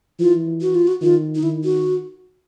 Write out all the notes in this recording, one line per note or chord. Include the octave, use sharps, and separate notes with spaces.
E3 F4
F#4
F4
F#4
D#3 F4
D#4
D#3 E4
F#4